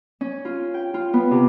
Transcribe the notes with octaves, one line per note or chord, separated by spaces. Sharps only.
C#4
F4
G5
F4
B3
C3